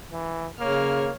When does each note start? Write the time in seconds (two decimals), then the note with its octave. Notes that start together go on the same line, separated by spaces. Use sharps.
0.12 E3
0.59 C#3 A#3 C#5 F6